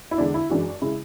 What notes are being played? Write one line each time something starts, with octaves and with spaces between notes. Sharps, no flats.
E4
E2 D3 G#3 D4
E4
F#2 E3 G#3 D4 F#4
C#3 G#3 E4